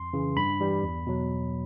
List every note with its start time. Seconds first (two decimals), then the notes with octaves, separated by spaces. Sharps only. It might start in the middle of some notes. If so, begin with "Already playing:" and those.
Already playing: F2 C6
0.13 C#3 E3
0.36 G2 B5
0.60 E3 G3
0.83 E2
1.07 B2 F#3